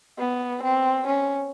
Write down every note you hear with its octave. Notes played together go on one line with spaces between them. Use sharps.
B3
C4
C#4